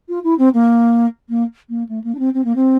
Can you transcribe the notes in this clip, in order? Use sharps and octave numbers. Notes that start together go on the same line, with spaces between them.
F4
E4
C4
A#3
A#3
A#3
A3
A#3
D4
C4
C4
A#3
C4